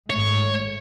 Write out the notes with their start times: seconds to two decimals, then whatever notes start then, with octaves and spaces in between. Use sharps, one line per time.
0.10 G#1 G#2 A3 C#5